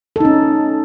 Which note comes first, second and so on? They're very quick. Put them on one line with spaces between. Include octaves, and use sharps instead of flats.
A4 D#4 C#4